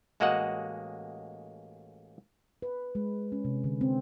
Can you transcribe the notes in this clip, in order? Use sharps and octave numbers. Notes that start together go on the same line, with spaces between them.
A1 G#3 A#3 F#4 D#5 F#5
B4
G#3
C#4
C3
D3
C4